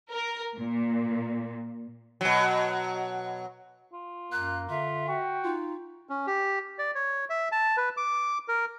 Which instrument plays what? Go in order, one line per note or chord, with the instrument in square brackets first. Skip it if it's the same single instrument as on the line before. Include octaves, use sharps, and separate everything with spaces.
[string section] A#4
A#2
[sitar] B2 F#3
[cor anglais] F4
[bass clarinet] F#2 [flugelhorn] A#3 [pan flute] F#6
[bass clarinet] D3 [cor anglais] F4 [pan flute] E5
[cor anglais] F#4 [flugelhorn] G5
[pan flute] D#4 [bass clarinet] F4
[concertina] C#4
G4
D5
C#5
E5
A5
B4
D6
A#4